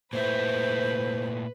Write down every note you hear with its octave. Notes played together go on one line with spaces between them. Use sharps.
A#2 A3 E4 B4 C5